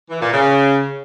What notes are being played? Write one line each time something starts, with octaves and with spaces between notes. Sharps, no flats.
E3
A#2
C#3